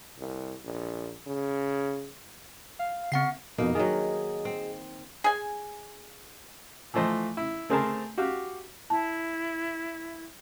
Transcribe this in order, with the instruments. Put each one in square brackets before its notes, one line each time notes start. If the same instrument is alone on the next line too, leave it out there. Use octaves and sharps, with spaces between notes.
[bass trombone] C2
A#1
C#3
[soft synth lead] F5
[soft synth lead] C#3 [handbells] C4 F#5 C7
[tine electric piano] F2 B2 [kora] A#3 D#4
[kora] D#3 F#3 [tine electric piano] G#4 D#5
[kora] C4
[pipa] G#4 G#5
[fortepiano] E3 F3 A3 C5 D#5
E4
A3 C4 G#4 A#4 C5 A5
F#4 G4 F5
[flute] E4 [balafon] A5